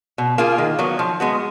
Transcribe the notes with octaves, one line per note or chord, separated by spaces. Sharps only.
B2
A#3 F4 G#4
D#3
F#3 B3
F3
G#3 B3 F#4